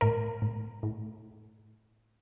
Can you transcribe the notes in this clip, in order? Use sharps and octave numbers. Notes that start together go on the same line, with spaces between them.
A2 A#4
A2
A2